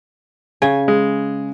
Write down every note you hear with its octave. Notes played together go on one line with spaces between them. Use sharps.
C#3 C#5 G#5
G#3